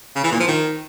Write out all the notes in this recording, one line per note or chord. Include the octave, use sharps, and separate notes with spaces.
C#3
E3
A#2
F3
D#3